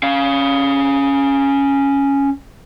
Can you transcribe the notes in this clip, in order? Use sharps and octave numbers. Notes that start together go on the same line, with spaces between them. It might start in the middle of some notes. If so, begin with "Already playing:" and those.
C#4 F5